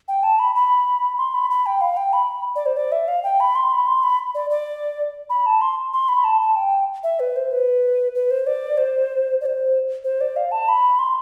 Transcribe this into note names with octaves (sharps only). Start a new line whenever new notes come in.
G5
A5
B5
B5
C6
B5
B5
G5
F5
G5
B5
D5
C5
D5
E5
F5
G5
B5
C6
B5
C6
B5
D5
D5
B5
A5
C6
C6
B5
A5
A5
G5
E5
B4
C5
B4
B4
C5
D5
C5
D5
C5
C5
D5
F5
A5
B5
C6